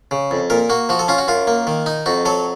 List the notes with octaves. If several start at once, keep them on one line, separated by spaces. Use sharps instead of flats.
C#3
F2
A#2 A#4
A#3 F#4
F3 F#4
A4
C#4 F4
F#4
F#2 F4
A#3
D#3
D#4
F2 F#4
F#3 A4